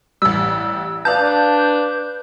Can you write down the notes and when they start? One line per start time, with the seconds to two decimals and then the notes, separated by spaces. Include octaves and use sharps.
0.22 A1 G3 E6
1.05 B4 D5 F5 A5 G6
1.21 D4